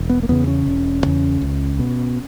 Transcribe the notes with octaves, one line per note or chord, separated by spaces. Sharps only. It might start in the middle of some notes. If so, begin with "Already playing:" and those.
Already playing: E1
B3
A#3
E2 C#3 B3
C#4
E1
E2 C#3
C#2
B2